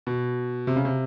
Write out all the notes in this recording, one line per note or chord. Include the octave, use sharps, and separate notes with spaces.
B2
C3
C#3
C3